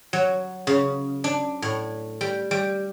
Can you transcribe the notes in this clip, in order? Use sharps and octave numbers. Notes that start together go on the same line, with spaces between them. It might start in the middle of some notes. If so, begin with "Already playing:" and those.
F#3
C#3
D4
A2
G3
G3